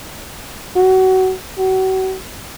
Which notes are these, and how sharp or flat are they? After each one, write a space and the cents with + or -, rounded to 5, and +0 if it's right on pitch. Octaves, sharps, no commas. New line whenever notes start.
F#4 +25
F#4 +35